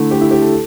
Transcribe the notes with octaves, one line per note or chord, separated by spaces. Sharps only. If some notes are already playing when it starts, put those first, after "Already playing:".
Already playing: D3 A3 E4
G4
E4
G4
A4